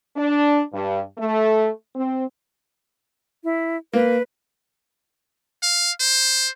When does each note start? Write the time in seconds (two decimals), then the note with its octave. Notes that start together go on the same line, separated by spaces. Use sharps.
0.15 D4
0.72 G2
1.18 A3
1.95 C4
3.44 E4
3.93 A#3 B4
5.63 F5
6.00 C5